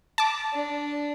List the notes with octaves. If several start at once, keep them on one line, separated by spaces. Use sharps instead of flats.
A5 D6
D4